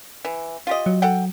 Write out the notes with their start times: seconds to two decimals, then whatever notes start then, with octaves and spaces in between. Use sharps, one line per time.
0.25 E3
0.67 F4 G4 D#5
0.86 F#3
1.02 A4 F#5 G5